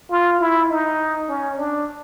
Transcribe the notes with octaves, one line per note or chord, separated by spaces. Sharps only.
F4
E4
D#4
C#4
D4